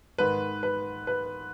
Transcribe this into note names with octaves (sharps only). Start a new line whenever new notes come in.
G#2 D#3 B4
B4
B4